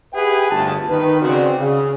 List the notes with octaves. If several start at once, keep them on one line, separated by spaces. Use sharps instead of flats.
G4 G#4 B4 E5 F#5 G5
G1 D2 A3 F4 A5
D#3 B4
C#3 C4 F#4 D5
C#3